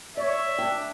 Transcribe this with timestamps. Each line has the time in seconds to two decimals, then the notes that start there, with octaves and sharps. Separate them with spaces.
0.17 C#5 D5 E5
0.58 D4 G5